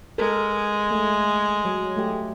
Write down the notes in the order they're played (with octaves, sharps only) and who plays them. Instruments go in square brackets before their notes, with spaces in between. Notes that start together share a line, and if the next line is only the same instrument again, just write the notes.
[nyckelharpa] G#3 [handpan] A4 A#4
[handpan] A3
F#3
A3 G4